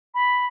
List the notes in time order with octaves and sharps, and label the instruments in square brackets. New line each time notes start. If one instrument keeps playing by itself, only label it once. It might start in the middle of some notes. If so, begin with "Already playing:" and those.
[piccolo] B5